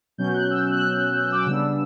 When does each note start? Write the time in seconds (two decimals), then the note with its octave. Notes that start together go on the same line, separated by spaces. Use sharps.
0.18 B2 F#3 C#4 G6
0.34 F#6
0.51 E6
0.71 F#6
1.15 F#6
1.24 E6
1.32 D6
1.40 E6
1.46 C#3 G3 B3 D4